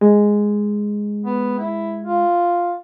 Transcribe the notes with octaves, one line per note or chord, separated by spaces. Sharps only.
G#3
B3
E4
F4